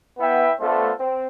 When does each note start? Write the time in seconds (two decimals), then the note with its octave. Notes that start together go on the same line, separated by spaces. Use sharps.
0.18 B3 E4 B4 E5 G5
0.59 A3 B3 D4 F4 A4 C5
0.99 C4